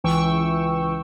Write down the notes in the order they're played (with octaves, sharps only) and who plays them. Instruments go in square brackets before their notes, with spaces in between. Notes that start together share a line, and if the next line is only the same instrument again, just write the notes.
[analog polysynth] C#2 E3 G5 C#6 E6